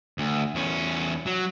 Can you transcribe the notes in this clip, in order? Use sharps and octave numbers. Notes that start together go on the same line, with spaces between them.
D2
E2 C#4
F#3